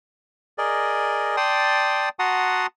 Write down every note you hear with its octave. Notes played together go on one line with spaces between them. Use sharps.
G#4 A#4 D5 D#5
D5 G5 A5 C6 D#6
F#4 F#5 A5 A#5 C6 D#6